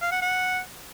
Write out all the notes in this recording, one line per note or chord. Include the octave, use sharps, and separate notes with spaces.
F5
F#5
F#5